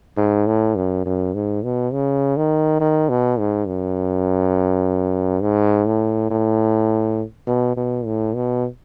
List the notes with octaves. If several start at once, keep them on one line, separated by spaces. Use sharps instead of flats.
G#2
A2
F#2
F#2
G#2
B2
C#3
D#3
D#3
B2
G#2
F#2
G#2
A2
A2
B2
B2
A2
B2